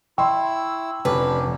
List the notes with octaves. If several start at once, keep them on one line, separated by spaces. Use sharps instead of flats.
E4 E5 G5 C6 C#6 E6
F1 C#4 D4 G4 B4